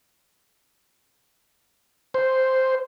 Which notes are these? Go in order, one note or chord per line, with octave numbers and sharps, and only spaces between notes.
C5